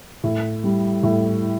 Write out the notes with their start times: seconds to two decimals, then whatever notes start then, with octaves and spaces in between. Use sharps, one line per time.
0.24 A2
0.64 G3
1.03 A2